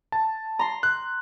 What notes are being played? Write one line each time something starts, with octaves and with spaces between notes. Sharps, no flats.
A5
A#5 C6
F#6